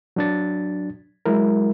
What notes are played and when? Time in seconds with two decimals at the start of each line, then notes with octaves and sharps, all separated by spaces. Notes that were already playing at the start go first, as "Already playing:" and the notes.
0.16 F#3 D4 A6
1.25 F#3 G#3 E4 A#4